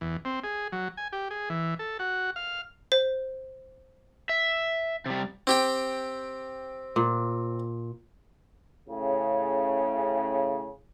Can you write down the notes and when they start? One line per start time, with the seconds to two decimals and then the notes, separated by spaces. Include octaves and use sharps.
0.01 E2
0.25 C4
0.44 G#4
0.72 F#3
0.97 G#5
1.12 G4
1.31 G#4
1.50 E3
1.79 A4
1.99 F#4
2.36 F5
2.92 C5
4.29 E5
5.06 C3 G3
5.47 C4 G4 G5
6.96 A#2
8.87 A2 C#3